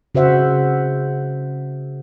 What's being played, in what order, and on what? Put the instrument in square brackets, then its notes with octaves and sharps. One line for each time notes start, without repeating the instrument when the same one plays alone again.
[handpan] C#3 F#4 C5 E5 F#5